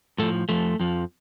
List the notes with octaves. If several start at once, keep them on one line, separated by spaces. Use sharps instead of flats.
A2 F3 A3
F2 F3 A3
F2 F3